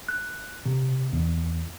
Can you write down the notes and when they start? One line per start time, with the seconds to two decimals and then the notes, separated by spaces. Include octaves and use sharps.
0.08 F#6
0.66 C3
1.13 E2